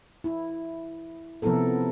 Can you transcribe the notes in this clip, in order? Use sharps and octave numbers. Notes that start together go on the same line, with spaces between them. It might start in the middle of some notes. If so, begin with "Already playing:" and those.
E4
C3 F3 B3 E4 A4 A#4